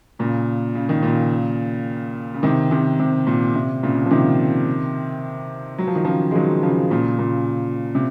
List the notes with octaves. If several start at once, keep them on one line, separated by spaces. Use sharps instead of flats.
A#2 C#3
C#3
D#3
A#2 C#3
C#3
C3 D#3
C3 D#3
C3
A#2
C3
A#2 C#3
F3
C3 D#3
F#3
F3
D#3
C#3 F3
G#3
D#3 F#3
C#3 F3
A#2 C#3
A#2 C#3
C3